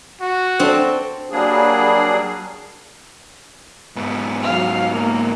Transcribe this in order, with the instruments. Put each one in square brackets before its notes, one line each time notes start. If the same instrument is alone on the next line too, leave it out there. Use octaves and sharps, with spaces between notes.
[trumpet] F#4
[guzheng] C4 [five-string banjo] D4 A4
[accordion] F#3 G3 A#3 D4 G#4
[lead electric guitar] G#2 B3
[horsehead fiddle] F#3 F5
A#3